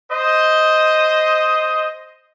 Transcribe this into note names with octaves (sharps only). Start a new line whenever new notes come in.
C5 D#5